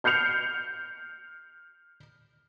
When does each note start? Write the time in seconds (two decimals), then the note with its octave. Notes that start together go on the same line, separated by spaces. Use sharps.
0.04 F6 G6 C7 C#7 F7